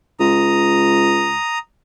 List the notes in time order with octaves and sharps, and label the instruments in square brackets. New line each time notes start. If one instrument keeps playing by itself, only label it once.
[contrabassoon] C#2 [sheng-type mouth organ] A#5 D#6